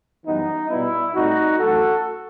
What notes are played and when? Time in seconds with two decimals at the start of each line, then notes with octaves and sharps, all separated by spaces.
0.24 F#2 E3 G3 B3 D#4
0.69 B2 G3 B3 E4
1.13 A2 G3 C4 D#4 F#4
1.58 F#2 E3 A3 F#4 A4